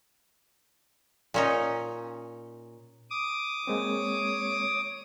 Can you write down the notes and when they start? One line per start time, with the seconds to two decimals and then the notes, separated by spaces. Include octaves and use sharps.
1.34 A#2 C#4 D#4
3.10 D6 D#6
3.67 G#3 A#3 C4 C#5